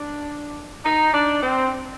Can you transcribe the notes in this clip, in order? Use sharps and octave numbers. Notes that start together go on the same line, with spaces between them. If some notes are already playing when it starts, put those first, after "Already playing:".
Already playing: D4
D#4
D4
C4